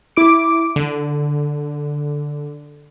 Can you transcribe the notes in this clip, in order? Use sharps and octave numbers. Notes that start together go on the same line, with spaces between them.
E4 D6 D7
D3